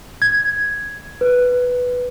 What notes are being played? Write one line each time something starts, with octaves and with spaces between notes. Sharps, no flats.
G#6
B4